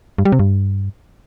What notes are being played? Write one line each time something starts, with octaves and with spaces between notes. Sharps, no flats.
G2
G3
C3
G2